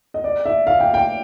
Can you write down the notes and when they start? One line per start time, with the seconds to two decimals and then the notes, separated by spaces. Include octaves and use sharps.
0.14 D#5
0.24 D5
0.46 E5
0.67 F5
0.80 G5
0.94 G5